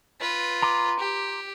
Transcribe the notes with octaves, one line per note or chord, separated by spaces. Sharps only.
F4 B4
A#5 C6 D6
G4